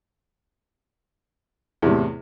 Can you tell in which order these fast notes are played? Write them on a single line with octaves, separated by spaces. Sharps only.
E2 C3 A2